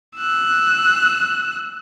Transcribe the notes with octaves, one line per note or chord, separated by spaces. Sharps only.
E6 F#6